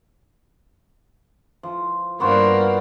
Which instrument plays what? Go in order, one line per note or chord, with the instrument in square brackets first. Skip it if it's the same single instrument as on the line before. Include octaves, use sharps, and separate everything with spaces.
[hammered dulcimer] F3
[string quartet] G2 A#3 D4 [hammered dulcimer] B3 F#4 C5